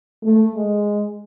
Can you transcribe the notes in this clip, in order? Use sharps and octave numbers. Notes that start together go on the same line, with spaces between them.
A3
G#3